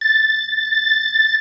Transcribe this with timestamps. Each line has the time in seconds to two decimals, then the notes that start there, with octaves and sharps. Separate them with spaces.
0.01 A6